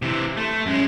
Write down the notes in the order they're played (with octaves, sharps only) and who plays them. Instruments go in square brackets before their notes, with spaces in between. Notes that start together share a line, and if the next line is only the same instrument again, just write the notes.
[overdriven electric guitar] C3 E3
[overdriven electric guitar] A3 [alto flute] C6
[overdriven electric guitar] F#2 G#3 [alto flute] C#4